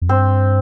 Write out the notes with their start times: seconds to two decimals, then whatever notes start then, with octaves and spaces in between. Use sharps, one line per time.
0.02 F2
0.09 G2 C4